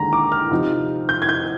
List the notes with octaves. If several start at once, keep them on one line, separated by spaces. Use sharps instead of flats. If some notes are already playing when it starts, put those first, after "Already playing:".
Already playing: D#2 D3 G#3 A#5
D6
F6
C3 F3 C4 D#4
G6
G#6
G6